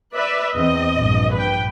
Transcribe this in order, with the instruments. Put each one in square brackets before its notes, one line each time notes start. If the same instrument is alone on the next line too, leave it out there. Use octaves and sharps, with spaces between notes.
[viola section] B4 D5 E5
[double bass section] E2 B3 C4 [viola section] D#5
[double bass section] A#1 G2
[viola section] B4 G5